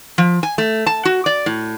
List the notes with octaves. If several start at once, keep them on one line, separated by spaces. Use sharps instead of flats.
F3
G#5
A3
A5
F#4
D5
A2